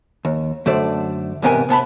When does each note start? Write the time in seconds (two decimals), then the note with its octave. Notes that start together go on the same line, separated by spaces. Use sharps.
0.25 D#2
0.66 F#2 D3 A3 A4 C5 D5
1.42 E2 G#2 C3 B3 A#4 G#5
1.69 C3 B3 A5 B5